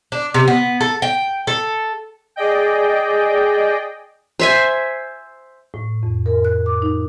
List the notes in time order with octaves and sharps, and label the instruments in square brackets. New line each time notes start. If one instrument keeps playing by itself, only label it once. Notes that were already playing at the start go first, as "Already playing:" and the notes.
[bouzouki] D4
C3
B3
A4
G5
A4
[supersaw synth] G#4 D5 D#5 G5
[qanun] C5 E5 G#5
[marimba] A2
F2
A#4
F#6
D6
D#4